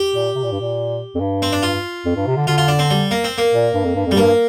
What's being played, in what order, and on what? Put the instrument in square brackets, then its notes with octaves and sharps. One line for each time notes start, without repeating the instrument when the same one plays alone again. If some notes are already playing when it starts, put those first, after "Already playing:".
Already playing: [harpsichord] G4
[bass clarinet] A#2
C3
A#2
G2
A#2
F2
G2
[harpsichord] C4
D4
F4
[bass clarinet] F2
G2
C3
D3
[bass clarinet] D3 [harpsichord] F4
[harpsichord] F4
D4
C4
G3
A#3
C4
A#3
[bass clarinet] A#2
G2
F2
G2
F2
[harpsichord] G3
[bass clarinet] G2 [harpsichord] A#3